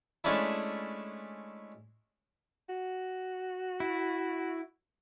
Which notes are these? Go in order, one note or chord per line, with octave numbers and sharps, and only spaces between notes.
G#3 A3 C#4 D4 E4
F#4
E4